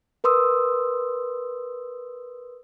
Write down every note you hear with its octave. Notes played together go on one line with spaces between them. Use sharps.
A#4 B4 C6 D#6 E6